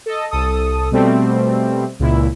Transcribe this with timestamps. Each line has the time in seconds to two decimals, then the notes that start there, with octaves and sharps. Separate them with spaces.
0.06 A4 D#5
0.31 C2 A4 D#6
0.91 B2 G3 A3 C4
2.00 C#2 A#2 E4